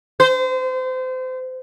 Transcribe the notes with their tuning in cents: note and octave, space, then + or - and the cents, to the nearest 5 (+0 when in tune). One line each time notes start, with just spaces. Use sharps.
C5 -30